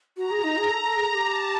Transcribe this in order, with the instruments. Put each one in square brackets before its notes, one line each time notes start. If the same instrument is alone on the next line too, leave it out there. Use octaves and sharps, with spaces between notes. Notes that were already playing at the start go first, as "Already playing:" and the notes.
[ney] F#4 [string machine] A#5
[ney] G#4
D#4
G#4
A4
A4
G#4
G#4
G4
[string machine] A5